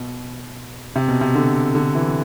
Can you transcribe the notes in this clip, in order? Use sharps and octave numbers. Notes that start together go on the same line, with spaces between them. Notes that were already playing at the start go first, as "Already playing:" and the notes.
Already playing: B2
C3
B2
C3
D3
D3
E3